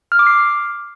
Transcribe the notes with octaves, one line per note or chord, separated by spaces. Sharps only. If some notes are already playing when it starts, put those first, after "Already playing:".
F6
D6
C7